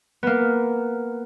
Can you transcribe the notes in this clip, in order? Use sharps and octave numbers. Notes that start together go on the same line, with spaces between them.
A#3 B3